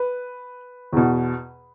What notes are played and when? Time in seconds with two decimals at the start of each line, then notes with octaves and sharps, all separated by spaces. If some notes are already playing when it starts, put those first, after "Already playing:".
Already playing: B4
0.93 E2 B2